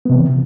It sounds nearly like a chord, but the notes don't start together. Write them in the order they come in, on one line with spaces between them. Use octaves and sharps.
B3 C3 E3